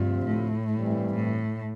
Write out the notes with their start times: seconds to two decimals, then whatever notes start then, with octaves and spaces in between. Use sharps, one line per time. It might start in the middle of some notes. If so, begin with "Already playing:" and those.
Already playing: D2 G2 C3 F3 C4 F4
0.26 A2
0.70 G2 E3 G3 C4
1.14 A2